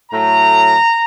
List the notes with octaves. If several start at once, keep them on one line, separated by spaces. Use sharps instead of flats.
A2 F#3 A3 A#5